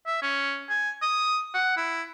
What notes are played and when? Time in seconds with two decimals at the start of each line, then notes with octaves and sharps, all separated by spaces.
0.06 E5
0.22 C#4
0.69 G#5
1.02 D#6
1.54 F#5
1.77 E4